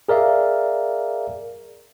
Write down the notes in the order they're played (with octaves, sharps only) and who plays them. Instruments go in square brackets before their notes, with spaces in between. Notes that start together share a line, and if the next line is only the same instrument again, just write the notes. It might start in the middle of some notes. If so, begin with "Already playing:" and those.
[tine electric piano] G#4 A#4 D5 E5 F5